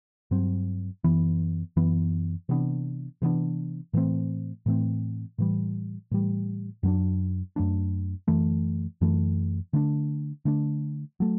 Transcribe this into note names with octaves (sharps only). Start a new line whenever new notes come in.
G2 F#3 C4
F#2 E3 B3
F#2 E3 B3
C3 E3 B3 D4
C3 E3 B3 D4
A2 E3 A3 C4
A2 E3 A3 C4
A2 E3 G3
A2 E3 G3
F#2 F#3 A3 D4
F#2 F#3 A3 D4
F#2 E3 A3
F#2 E3 A3
D3 A3 D4
D3 A3 D4
F#3 A3